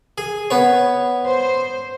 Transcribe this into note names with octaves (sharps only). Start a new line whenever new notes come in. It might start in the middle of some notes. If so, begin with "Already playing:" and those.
G#4
B3 C#5
C5